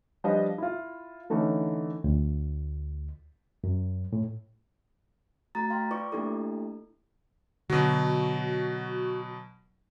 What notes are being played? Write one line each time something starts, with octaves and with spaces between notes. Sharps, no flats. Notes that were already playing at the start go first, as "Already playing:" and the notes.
F3 G3 D4 F4 B4 D#5
E4 F4
D3 E3 A3 C#4 D#4
D2
F#2
A2
A3 F#4 A#5 A6
F5 G5 C6
F4 B4 D5 C#6 D6
A3 A#3 D4 E4 G4 A4
B2 D3 F#3 F#4